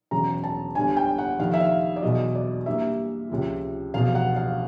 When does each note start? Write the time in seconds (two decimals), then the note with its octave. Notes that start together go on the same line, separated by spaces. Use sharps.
0.11 E1 E2 C#3 F#3 A#5
0.44 A5
0.75 G1 G2 D3 G#5
0.97 G5
1.18 F#5
1.39 F2 C3 D#3 F5
1.54 E5
1.60 F5
1.96 D5
2.03 E2 B2 F#3 D#5
2.35 D5
2.66 G2 E3 G3 A#3 E5
3.29 C#2 C3 F3
3.94 F1 E2 B2 F5
4.15 F#5
4.36 F5